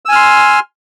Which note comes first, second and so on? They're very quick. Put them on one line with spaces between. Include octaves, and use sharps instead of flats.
E6 G#5 F6 C6